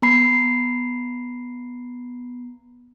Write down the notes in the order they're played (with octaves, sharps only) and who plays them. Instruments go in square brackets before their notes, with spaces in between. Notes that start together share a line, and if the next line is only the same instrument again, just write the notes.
[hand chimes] B3 A#5 B5 C7